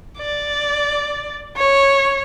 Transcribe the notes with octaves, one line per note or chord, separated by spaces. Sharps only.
D5
C#5